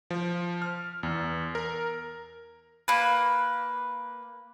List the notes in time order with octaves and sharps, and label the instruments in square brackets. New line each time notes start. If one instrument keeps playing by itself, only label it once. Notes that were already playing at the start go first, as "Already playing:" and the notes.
[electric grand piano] F3
F6
E2
A#4
[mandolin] A#3 B4